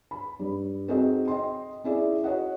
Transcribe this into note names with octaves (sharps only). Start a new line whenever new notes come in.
B5
G2
C4 D#4 F#4 G#4 A4 D#5
D#5 G5 C6
C#4 E4 G#4 D5
F#4 C#5 D#5 F#5